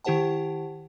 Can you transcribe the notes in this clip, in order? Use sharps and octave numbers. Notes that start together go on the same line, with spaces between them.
D#3 E4 G4 C5 F#5 A5